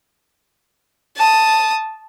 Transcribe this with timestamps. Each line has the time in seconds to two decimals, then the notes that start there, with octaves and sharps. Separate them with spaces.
1.17 A5 D#6